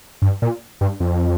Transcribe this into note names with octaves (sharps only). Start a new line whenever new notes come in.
G2
A#2
G2
F2